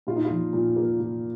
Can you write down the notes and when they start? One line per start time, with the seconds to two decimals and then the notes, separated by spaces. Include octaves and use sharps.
0.07 A#2 F4
0.16 D#4
0.25 F4
0.30 F3
0.53 A#2
0.76 A#3
1.00 A#2